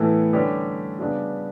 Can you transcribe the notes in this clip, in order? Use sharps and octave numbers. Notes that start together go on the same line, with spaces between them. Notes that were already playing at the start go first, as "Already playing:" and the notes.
Already playing: A2 E3 B3 E4 A4
D3 G3 C#4 G4 B4
C#3 G3 B3 D4 F#4